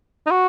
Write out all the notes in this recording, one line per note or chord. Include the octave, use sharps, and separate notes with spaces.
D#4
F#4